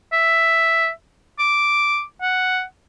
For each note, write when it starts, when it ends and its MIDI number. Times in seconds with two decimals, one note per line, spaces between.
0.13 0.90 76
1.39 2.02 86
2.22 2.63 78